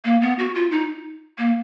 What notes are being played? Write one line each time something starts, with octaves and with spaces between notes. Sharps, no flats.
A#3
B3
F#4
F4
D#4
A#3